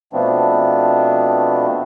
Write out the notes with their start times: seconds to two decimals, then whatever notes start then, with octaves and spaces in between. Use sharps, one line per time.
0.13 B2 F3 A3 B3 C4 D4